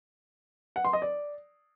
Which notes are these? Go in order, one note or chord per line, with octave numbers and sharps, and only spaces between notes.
F#5
C6
D#5
D5